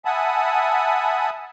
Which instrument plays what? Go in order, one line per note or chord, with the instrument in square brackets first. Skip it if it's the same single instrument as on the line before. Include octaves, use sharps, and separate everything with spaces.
[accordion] E5 F#5 G#5 A5 B5 D#6